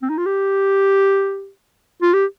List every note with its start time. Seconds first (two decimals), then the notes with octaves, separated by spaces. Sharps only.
0.03 C4
0.10 D#4
0.18 F4
0.26 G4
2.03 F4
2.14 G4